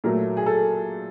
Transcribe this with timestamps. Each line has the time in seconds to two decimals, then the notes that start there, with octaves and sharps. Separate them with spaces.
0.04 A#2 F#3 A3 A#4
0.37 G#4
0.46 A4